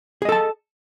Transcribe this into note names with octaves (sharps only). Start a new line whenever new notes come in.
G#4 A4 D#5 A5